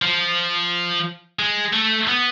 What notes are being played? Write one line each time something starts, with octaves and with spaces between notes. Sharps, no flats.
F3
G#3
A3
B3